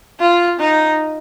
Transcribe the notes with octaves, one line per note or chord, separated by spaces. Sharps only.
F4
D#4